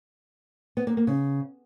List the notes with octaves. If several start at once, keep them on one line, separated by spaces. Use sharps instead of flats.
B3
A#3
A#3
C#3